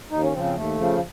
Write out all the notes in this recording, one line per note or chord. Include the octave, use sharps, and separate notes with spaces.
D#2 D#4
C#4
C#3 F3 C4
C4
D#2 A3
C#3 F3